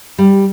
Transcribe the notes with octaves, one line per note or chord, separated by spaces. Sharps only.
G3